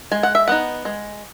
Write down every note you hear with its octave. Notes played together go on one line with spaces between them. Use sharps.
G#3 G#5
F#5
E5
B3 D#4 F#5
G#3